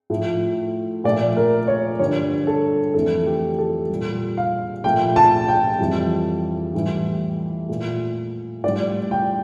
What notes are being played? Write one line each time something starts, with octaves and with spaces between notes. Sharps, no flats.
A2 F3 A3
A#2 F3 A3 D5
A#4
C#5
G2 D3 G3 C#5
A4
F2 E3 A3 A4
G4
A4
A#2 G3
F5
A#2 F3 A3 G5
A5
G5
F2 E3 G3
A2 E3 G3
A#2 A3
A2 G3 D5
G5